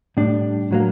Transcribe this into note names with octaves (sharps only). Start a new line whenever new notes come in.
A2 G3 D4
A2 F#3 A#3